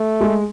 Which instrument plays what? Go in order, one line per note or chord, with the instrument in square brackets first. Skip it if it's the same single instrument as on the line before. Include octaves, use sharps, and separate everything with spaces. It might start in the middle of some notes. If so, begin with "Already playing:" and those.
Already playing: [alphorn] A3
[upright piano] G#3